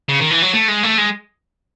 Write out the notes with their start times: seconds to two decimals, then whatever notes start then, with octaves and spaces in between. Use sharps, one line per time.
0.09 C#3
0.20 D#3
0.31 E3
0.42 F#3
0.54 A3
0.68 G#3
0.83 A3
0.98 G#3